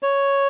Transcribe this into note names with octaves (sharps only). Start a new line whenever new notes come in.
C#5